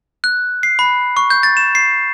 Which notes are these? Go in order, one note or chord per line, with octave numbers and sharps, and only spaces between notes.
F#6
C7
B5
C#6
G6
A6
E7
C7